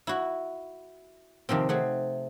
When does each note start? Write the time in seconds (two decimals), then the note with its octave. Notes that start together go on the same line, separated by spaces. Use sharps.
0.07 E4 F#4
1.49 C3 D#3 F3 C4
1.69 A3 C4 G#4 F#5